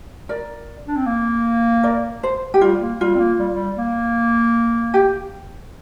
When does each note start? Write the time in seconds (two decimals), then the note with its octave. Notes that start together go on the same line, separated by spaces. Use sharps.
0.29 A#4 D5
0.88 D4
0.97 C4
1.06 A#3
1.83 A#4 D5
2.23 C5
2.54 G4
2.61 G3 F4
2.81 A#3
3.01 G3 F4
3.15 C4
3.19 A#3
3.39 G3
3.53 G3
3.78 A#3
4.94 G4